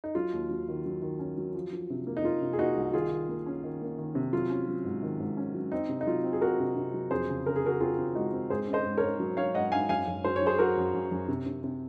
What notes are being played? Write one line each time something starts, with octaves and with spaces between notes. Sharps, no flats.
D#4
F#3 F4
D#2
F#3
D#3
F#3
D#3
C#4
F#3
F3
F3
C3
A#3
D#4
A#3 F4
C3
G#4
A#3 D#4 F#4
C2
D#3 F4 G#4
D#3
A#3
C#4
D#3
A#3
D#3
C3
F#3 F4
C#4
F#3
G#2
D#3
G#2
C#4
F#3
C4 D#4
C3
D#4
F#3 F4
C4
G#4
C4 F#4 A#4
C3
C3
F#3
F2 G#4 C5
C#3
C#3 A#4
G#4
C#3 F#4 A#4
C4 F4 G#4
C4
G#3 D#4 F#4
C4
G#2 G#4 C5
C#4
C5 D#5
G#2
A#4 C#5
G#2
F#3
F#3 C#5 F5
G#2 D#5 F#5
G#2 F5 G#5
F#2 F5 G#5
F#2
F#3 C5
C#5
F#3 G#4 C5
F#3 F#4 A#4
F#2
F#2
F#2
C3
C3
C3